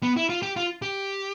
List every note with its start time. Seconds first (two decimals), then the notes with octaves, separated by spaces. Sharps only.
0.03 B3
0.17 E4
0.30 F4
0.42 G4
0.56 F4
0.82 G4